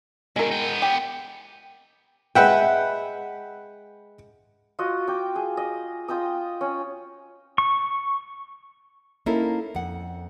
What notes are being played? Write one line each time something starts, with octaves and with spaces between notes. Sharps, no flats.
B2 D#3 G#3 A#4
B3 G5
G4
G#3 B4 E5 F#5 G5
F4 F#4 D#5
G5 D6
G#4
D#5
F4 D#5 G5 D#6
C#4
C#6
A#3 C#4 D#4 E4 A4 A#4
F2 F#5